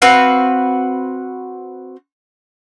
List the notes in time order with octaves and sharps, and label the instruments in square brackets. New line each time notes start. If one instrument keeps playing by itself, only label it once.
[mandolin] C4 F#4 B4 F5